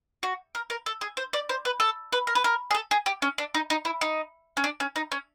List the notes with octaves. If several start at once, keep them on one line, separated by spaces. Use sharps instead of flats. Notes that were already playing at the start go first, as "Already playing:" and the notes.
F#4
A#4
A#4
A4
G#4
C5
D5
C5
B4
A4
B4
A#4
B4
A#4
G#4
A4
G#4
G4
C#4
D4
D#4
D#4
E4
D#4
C#4
D4
C#4
D#4
C#4